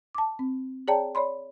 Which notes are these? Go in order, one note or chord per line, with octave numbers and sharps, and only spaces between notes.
A5 D6
C4
G#4 C#5 D5 G5 A5 A#5
C#5 D5 B5 C6